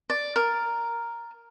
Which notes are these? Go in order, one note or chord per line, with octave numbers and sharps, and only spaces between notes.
D5
A#4